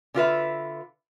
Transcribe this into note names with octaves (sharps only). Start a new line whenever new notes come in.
D3 F4 B4 E5